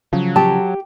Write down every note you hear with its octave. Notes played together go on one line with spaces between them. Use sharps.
C#3 F3 F#3
G4 A5